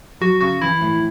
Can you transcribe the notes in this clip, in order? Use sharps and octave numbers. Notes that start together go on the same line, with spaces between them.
F#3 F#4
C#3 F#4
E3 E4
A2